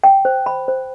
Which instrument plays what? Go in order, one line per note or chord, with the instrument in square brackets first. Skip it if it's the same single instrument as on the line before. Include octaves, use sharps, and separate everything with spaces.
[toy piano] G5
C5
B5
C5